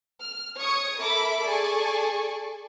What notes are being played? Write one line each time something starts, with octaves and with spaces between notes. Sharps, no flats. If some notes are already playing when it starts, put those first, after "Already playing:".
F6
C#5 C#6 D#6 G#6 C#7
A4 A#4 E5 B5 D6
G#4 A4 D5 G#5 A5 C#6